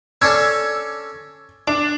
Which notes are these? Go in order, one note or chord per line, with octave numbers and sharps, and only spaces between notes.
C#4 D4 A4 E6 G#6
D4 D6